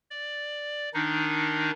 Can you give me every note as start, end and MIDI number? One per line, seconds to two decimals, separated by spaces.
0.11 0.89 74
0.94 1.71 51
0.94 1.71 62
0.94 1.71 63